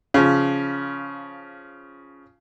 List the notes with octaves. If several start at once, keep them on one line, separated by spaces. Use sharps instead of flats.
C#3 F3